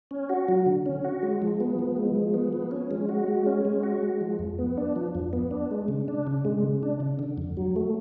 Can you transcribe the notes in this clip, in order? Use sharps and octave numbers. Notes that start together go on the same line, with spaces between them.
C#4
F#4
F#3
D3
C#4
F#4
G#3
F3
B3
F3
G#3
F3
B3
F3
C#4
G#3
F#4
G#3
C#4
G#3
F#4
G#3
F3
F2
B3
D4
F3
F2
B3
D4
G#3
C#3
D4
C#3
G#3
C#3
D4
C#3
D3
F2
F#3
A3